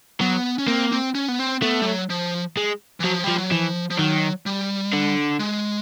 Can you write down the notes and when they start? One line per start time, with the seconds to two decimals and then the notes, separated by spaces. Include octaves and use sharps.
0.21 F#3 B3
0.58 C#4
0.68 A#3 C4
0.92 C4
1.15 C#4
1.28 B3
1.39 C4
1.62 A3 B3
1.82 G3
1.86 F#3
2.10 F3
2.57 G#3
3.00 E3
3.04 F3 F#3
3.24 F3 G3
3.38 F#3
3.51 E3 F3
3.91 F3
3.98 D#3 F#3
4.46 G3
4.93 D3
5.40 G#3